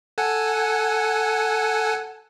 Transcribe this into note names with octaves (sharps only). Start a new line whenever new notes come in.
A4 F#5 G#5